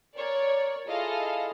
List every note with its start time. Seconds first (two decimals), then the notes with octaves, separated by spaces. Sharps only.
0.16 A#4 C#5 D5
0.87 E4 F4 G#4 A4 D#5 F5